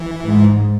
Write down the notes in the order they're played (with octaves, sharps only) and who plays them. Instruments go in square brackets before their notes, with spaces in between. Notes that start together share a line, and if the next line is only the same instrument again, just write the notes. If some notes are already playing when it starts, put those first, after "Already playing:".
Already playing: [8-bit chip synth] E3
[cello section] G#2